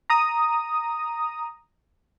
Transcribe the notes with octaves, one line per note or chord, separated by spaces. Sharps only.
A#5 D#6